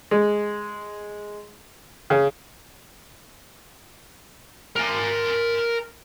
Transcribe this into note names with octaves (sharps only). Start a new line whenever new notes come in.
G#3
C#3
A#4 G#5